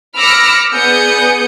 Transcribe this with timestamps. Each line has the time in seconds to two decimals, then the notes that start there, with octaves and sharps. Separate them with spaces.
0.15 B5 D6 E6 F6 A#6 C#7
0.74 B3 G#4 D5 D#6 G6 C#7